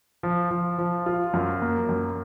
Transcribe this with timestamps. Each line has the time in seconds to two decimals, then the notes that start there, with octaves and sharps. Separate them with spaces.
0.23 F3
0.51 F3
0.78 F3
1.06 F4
1.34 F#2
1.62 A#3
1.89 F#2